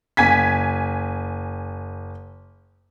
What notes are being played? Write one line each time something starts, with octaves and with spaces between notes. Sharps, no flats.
F#1 G#5 G#6 B6